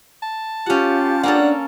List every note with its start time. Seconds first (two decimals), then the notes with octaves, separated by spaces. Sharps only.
0.23 A5
0.66 C#4 F4 G4 F#5
1.23 A#3 C#4 D4 A4 F#5